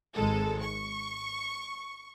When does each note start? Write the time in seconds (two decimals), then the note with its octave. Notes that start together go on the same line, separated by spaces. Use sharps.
0.14 G#1 G#3 A4
0.61 C#6